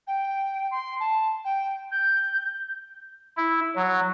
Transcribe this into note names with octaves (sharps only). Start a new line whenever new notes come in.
G5
C6
A5
G5
G6
E4
F#3